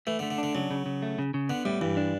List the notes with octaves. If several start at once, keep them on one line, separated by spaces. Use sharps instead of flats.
E3 A3
D3
A3
D3
D4
D3
C#3 F#3
C#3
C#3
A3
C#3
C#3
D3 B3
A2 G3
G2 E3
D4